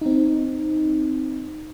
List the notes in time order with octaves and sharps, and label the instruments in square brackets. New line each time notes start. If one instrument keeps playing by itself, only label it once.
[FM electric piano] C4 D#4